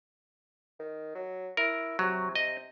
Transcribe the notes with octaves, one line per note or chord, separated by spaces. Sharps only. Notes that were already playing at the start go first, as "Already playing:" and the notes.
D#3
F#3
E4 A#4
C3 F#3
D#5